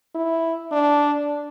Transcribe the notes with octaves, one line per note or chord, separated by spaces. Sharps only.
E4
D4